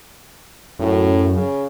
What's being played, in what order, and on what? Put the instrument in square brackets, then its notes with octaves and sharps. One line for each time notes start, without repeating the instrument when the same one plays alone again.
[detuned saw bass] F#2 [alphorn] A2
[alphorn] C#3